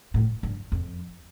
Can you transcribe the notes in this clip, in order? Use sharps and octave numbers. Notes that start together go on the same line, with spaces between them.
A2
G2
F2